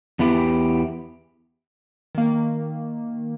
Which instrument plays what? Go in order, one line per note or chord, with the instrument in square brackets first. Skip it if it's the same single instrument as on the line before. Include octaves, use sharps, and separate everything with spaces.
[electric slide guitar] E2 B3 E4 G4
[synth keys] D#3 A#3